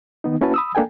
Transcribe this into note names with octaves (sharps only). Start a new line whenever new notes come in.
D#3 B3 D#4
A#3 C#4 E4 F#4 B4 A5
B5 D#6 E6
A#3 D4 A4 G5 G#5